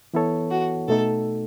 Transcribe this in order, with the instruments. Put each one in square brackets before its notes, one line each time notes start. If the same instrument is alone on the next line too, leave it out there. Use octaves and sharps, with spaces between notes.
[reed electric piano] E3 B3 E4 A4 C#5
[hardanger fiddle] F#4
[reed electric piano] B2 A3 D#4 [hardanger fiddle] A4